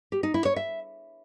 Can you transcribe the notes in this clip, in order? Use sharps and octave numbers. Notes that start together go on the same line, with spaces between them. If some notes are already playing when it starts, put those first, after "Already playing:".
G4
D#4
E4
C#5
E5